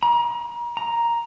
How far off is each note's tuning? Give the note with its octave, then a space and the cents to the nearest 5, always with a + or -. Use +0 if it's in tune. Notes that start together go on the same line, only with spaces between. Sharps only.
A#5 +35
A#5 +5